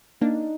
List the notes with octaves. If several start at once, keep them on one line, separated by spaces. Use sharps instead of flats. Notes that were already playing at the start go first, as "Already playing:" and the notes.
A#3 D4 D#4